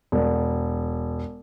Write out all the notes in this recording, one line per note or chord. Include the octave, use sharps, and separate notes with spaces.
E1